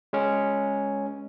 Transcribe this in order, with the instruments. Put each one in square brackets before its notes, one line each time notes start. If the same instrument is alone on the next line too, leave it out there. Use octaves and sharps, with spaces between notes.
[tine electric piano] G#3 C#4